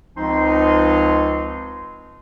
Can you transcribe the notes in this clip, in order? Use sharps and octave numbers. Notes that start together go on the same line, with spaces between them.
C#2 F3 C4 D#4 C6